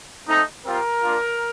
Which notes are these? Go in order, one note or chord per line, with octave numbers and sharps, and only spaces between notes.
A3 C4 D#4
G3 C4 F4 A#4
A#3 D4 F4